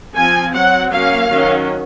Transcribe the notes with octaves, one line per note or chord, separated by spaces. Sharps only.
F3 C4 G#5
F#3 C4 F#5
F#3 A#3 C#4 F5
D#3 F#3 C#4